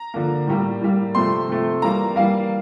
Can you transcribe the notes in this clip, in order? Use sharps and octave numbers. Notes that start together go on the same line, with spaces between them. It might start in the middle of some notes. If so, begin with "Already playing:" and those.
Already playing: A#5
D3 F3 A#3
A2 G3 A#3
A2 G3 A#3
C3 F3 A3 C4 C6
C3 F3 A3 C4
E3 G3 A#3 A#5
E3 G3 A#3 F5